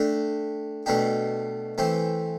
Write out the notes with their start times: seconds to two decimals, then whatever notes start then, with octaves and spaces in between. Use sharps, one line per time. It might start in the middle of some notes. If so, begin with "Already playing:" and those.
Already playing: A3 D4 G4
0.86 B2 A3 D4 G4
1.78 E3 A3 C4 G4